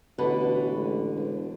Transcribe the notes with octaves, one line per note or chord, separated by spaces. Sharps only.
A1 B2 D3 B4
C#2
E1